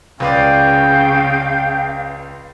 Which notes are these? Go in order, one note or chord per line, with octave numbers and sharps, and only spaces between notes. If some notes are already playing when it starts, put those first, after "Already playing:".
C#2 C#3 B4 D5 F5 G5